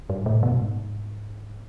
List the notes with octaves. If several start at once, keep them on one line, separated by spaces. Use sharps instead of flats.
G2
G#2
A2
B2
G2
G#2